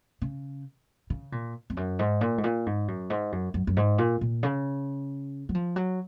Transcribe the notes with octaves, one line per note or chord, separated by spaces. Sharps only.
C#3
C#3
A#2
F2
F#2
G#2
A#2
G#2
A#2
G#2
F#2
G#2
F#2
F#2
F#2
G#2
A#2
A#2
C#3
F#3
F3
F#3